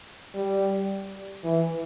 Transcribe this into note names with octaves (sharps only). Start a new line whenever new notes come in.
G3
E3